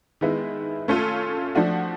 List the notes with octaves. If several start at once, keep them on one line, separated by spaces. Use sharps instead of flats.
D#3 G#3 B3 E4
A3 C#4 F4 A4
F3 A3 D4 F#4